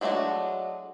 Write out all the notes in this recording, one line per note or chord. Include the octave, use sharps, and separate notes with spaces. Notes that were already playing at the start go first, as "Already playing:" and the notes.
F#3 G#3 A3 D4 F#4